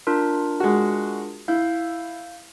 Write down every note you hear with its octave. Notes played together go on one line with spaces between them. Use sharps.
D4 F4 A#4
G#3 F#4
E4 F5 G6